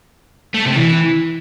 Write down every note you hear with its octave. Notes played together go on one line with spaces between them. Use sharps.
A3
C3
E3